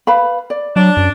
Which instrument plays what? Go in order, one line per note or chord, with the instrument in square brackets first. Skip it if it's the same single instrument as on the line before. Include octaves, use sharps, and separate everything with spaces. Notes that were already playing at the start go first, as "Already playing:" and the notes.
[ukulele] B4 F5 B5
D5
[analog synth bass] F#3 [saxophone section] D4
[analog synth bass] F#2